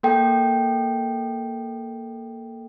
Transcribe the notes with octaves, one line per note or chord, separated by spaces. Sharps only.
A#3 A4 G5